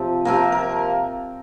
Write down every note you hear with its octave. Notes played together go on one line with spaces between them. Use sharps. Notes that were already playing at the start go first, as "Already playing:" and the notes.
Already playing: C3 F3 G4
C3 F3 A#3 A#4
A#4